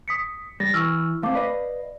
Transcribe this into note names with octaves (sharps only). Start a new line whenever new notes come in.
D#6 B6 C#7
G3 A6 A#6
E3 C#6 E6 F6
A3 C4 F5 A5 D6
B4 D5 D#5 F5